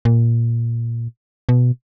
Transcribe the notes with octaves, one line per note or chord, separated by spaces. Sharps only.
A#2
B2